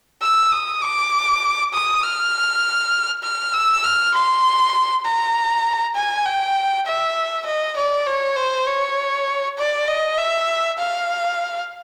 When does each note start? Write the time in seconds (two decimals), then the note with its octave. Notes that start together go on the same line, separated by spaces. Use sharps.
0.22 E6
0.52 D#6
0.82 D6
1.73 D#6
2.03 F6
3.23 F6
3.53 E6
3.84 F6
4.14 C6
5.05 A#5
5.95 G#5
6.26 G5
6.86 E5
7.46 D#5
7.77 D5
8.06 C#5
8.36 C5
8.66 C#5
9.57 D5
9.87 D#5
10.17 E5
10.78 F5